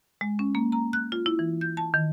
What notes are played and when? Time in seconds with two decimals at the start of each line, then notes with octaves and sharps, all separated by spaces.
0.21 G#3
0.39 C#4
0.55 A#3
0.72 A#5
0.93 F#6
1.12 F4
1.26 E4
1.39 E3
1.61 G6
1.77 A5
1.94 D#3